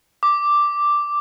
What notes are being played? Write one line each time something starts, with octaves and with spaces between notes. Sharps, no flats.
D6